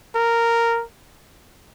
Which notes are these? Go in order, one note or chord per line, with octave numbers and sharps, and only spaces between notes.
A#4